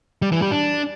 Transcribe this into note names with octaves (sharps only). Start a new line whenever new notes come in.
G3
E3
G3
D4